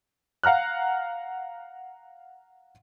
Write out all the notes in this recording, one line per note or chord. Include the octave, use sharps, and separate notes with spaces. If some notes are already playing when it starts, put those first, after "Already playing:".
F5 F#5 A#5 F6 F#6